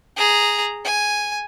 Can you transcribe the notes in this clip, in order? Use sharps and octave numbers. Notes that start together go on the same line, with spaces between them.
G#4 A#5
G#5